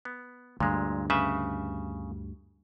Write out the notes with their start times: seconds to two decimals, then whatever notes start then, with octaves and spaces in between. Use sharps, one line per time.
0.05 B3
0.60 D2 G2 A#2 G#3
1.10 C#3 B4 E5